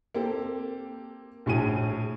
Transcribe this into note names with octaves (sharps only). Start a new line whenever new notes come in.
A#3 C4 G4 A4
A#1 A2 G#4 D#7